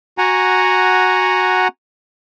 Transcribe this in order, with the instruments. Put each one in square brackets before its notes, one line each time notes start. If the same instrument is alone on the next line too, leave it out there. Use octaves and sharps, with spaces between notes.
[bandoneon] F#4 F#5 G#5 A#5